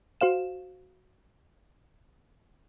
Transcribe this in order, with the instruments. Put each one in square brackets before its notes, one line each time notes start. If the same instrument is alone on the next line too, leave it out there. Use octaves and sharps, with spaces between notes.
[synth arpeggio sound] F#4 C5 F5 E7